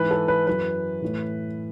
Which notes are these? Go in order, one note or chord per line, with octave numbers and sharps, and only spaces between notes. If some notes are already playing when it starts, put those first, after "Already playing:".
Already playing: G#2 E3 B4
A4
B4
F#2 E3 B4
A2 E3